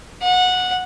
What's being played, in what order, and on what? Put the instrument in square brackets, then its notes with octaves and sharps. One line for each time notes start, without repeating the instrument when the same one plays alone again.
[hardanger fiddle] F#5